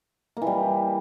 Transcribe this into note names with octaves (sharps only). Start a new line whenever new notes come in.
A#3
E3
G3